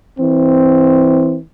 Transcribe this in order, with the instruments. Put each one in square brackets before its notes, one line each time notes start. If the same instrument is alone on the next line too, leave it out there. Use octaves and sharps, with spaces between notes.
[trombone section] E3 C4